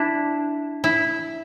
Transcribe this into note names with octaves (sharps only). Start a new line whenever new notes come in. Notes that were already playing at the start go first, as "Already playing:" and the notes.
Already playing: D4 E4
E4